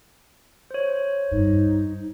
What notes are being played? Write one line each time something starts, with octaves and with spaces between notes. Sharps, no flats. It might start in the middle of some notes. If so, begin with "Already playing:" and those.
C5 C#5
G2 D#4